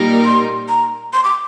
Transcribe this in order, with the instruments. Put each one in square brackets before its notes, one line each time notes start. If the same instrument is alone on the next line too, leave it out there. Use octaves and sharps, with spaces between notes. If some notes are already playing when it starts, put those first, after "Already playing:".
Already playing: [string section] A#2 G3 A#3 D#4 A#4
[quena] C6
A#5
C6
D6